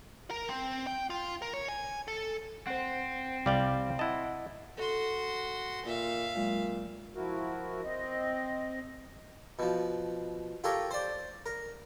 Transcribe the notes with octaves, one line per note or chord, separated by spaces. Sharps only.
A#4
C4
G5
F4
A#4
C#5
G#5
A4
C4 C5 F#5
C2 G3 D5 F5 G5
E4 D#5 F#5 A5
F#4 A4 C6
A#2 E5 F5
A#2 F#3 G#3
F3 E4 F#4 A#4
C4 D#5
B2 F3
F4 G4 A4 A#4 C#5
C5 D5
A#4